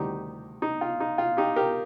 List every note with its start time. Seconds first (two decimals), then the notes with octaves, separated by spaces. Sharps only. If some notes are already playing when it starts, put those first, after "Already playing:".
Already playing: D2 C3 D#3 G3 D#4 G4
0.62 D#4
0.81 F4
1.00 D#4
1.18 F4
1.37 D#4 G4
1.56 G4 A#4